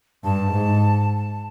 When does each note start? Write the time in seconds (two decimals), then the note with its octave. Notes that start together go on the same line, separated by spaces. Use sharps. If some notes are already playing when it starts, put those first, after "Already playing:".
0.24 G2 A5
0.52 G#2